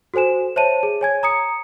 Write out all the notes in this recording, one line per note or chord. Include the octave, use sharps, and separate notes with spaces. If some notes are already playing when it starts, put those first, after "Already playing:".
F#4 A4 C5 G#5 E7
C5 C#5 E5 A5 D#7
G#4
C#5 G#5 G#6
A#5 D#6 C#7